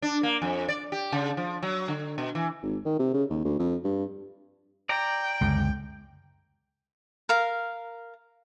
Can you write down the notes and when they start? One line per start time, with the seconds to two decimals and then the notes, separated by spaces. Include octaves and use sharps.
0.02 D4
0.23 A#3
0.42 F2
0.68 D5
0.92 G4
1.12 C#3
1.37 F3
1.63 F#3
1.88 D3
2.18 B2
2.35 E3
2.63 G#1
2.85 D#3
2.99 C3
3.14 C#3
3.30 D#2
3.45 D2
3.59 F2
3.84 G2
4.89 D5 G5 A#5
5.41 C#2 F#2 D3
7.29 A#4 F5